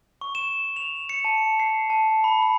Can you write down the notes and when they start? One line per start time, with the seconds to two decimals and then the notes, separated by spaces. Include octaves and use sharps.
0.21 C#6
0.35 E7
0.76 F7
1.09 C#7
1.25 A5
1.60 C7
1.90 A5
2.24 B5
2.42 B5